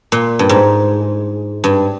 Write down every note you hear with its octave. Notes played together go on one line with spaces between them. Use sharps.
A#2
G2
G#2
G2